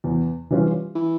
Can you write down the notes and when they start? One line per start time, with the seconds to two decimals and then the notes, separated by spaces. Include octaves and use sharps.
0.04 E2
0.51 E3 G3 C#4 F4
0.95 E3